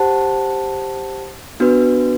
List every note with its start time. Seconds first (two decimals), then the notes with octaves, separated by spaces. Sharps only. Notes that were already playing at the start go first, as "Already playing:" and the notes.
Already playing: G4 C5 F#5 A5
1.60 B3 D4 F#4 B4